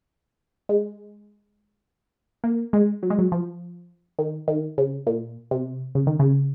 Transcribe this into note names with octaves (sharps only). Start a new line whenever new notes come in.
G#3
A#3
G#3
F#3
G#3
F#3
F3
D#3
D#3
C#3
A#2
C3
C#3
D#3
C#3